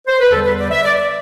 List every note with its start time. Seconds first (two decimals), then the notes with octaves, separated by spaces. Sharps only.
0.08 C5
0.20 B4
0.30 E2 D3 G3 A4
0.45 B4
0.58 D5
0.71 E5
0.84 D5
0.97 D5